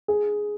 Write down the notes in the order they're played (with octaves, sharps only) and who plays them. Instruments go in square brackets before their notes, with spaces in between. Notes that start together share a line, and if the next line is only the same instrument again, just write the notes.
[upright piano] G#4